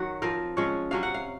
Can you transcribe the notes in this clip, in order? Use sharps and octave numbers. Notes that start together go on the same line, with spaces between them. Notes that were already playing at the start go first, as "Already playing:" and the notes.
Already playing: D#3 F#3 F#4
F3 C4 A#4
F3 G#3 C#4 C#5
C3 F#3 C#4 F5
F#5
F5